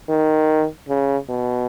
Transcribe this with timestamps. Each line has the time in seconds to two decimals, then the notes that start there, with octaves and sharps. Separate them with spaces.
0.09 D#3
0.89 C#3
1.29 B2